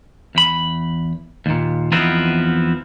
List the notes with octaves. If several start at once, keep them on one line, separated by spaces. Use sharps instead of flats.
E2 B5
D#2 A#2
E2 F3 B3 C4 D#4 E4